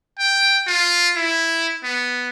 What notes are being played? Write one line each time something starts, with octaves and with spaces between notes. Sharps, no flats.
G5
F4
E4
B3